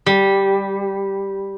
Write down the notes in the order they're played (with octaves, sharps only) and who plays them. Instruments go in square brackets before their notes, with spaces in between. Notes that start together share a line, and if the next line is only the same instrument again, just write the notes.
[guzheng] G3